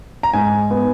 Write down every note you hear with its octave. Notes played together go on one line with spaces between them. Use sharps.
A#5
G#2 G#5
B3